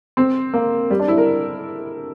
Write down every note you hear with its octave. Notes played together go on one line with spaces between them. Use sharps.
C4
A#3
G3
D4
E4
A#4